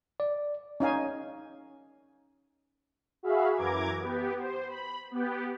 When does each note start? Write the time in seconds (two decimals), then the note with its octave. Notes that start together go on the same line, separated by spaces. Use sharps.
0.20 D5
0.80 C#4 D#4 F5 G#5
3.23 F#4 G#4 E5 F5 B5
3.56 F#2 E3 A#5 D6 G#6
3.98 B3 G4
4.39 C5
4.69 B5
5.11 B3 G4